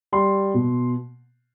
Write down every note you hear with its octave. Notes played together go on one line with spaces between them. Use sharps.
G3 C6
B2